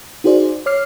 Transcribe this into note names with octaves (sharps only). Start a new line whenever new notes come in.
D#4 F#4 G#4 C5 D5
C#5 D6 F6 C7